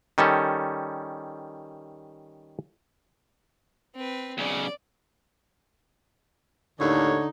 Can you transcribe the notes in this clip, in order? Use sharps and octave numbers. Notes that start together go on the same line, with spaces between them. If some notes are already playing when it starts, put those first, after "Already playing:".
D#3 G3 C#4 A4
C4 B4
B1 C#3 D5
D#2 A2 D3 D#3 D#4 C#5